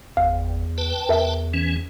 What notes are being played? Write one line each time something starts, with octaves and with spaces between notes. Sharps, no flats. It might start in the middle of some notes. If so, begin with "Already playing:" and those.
G1 E2 F5
B4 G5 A5
E2 A#4 E5
E3 C#4